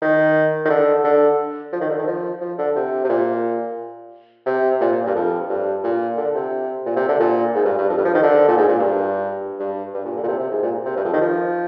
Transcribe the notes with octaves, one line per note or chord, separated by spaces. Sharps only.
D#3
D#3
D3
D3
F3
D#3
D3
D#3
F3
F3
D3
C3
C3
A#2
C3
A#2
A#2
G2
F2
G2
A#2
D3
C3
A#2
C3
D3
A#2
G#2
G2
G2
F2
G2
F3
D#3
D3
A#2
G#2
A#2
G2
G2
G2
A#2
D3
A#2
C3
C3
G#2
A#2
C3
G2
F2
D#3
F3